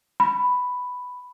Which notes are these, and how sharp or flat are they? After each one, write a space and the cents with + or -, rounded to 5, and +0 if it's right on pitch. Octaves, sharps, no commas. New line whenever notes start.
B5 +5